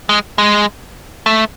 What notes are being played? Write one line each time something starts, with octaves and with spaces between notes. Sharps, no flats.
G#3
G#3
A3